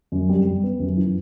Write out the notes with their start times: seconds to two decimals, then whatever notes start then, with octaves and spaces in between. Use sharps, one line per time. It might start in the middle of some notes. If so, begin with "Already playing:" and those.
0.12 F#2
0.29 G3
0.45 G3
0.63 B3
0.79 F#2
0.97 E3